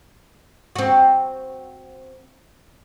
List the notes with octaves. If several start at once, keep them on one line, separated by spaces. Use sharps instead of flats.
C4 F#4